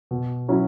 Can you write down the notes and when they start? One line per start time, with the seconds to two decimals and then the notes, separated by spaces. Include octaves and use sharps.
0.11 B2
0.48 F#3 C#4 E4